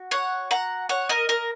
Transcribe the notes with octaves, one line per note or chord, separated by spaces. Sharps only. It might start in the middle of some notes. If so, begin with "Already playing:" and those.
Already playing: F#4
C#5 F#5
F#5 A#5
C#5 F#5
A#4 D#5
A#4 D#5